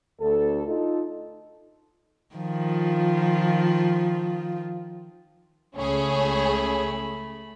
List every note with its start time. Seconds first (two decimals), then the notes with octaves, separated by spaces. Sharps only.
0.20 D2 A4
0.68 D#4 F4 A4
2.36 D#3 F3 F4
5.76 C#2 A3 C#4 G#4 B5